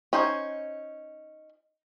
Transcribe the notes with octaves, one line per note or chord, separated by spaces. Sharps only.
C#4 D#4 C5 G#5